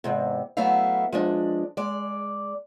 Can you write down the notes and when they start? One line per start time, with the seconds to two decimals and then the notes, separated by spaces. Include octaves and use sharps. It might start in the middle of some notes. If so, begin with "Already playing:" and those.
0.04 E2 G#2 C3
0.57 F#3 A3 B3 E4 E5 F5
1.12 F3 G#3 D4
1.77 G#3 D5